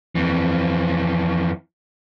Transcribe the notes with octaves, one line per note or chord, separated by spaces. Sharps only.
F2 E3